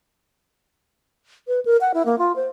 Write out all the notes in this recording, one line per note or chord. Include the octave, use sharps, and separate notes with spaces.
B4
A#4
F#5
E4
A#3
F4
C5